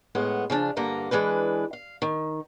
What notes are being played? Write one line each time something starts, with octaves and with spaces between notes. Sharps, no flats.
A2 G#3 B3 F#5
C#3 F3 D4
G2 D3 A#3 A#5
E3 G#3 D4 B4
F5
D#3